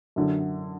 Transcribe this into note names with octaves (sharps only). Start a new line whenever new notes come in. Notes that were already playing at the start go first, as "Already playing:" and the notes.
F#2 D3 F#3